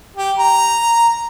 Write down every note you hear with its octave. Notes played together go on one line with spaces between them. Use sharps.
G4
A#5